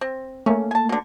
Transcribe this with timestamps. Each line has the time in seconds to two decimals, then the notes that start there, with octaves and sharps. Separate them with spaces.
0.01 C4
0.46 A3 A#3 C#4
0.71 G#5 A5
0.89 B2 D3